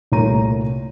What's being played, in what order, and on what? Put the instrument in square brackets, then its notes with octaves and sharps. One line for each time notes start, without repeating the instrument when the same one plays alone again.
[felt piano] C2 A#2 A3 C#5 A#5 D#7